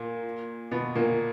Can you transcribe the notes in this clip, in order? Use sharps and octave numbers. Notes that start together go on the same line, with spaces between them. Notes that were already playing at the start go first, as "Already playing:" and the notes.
Already playing: A#2 A#3
B2 B3
A#2 A#3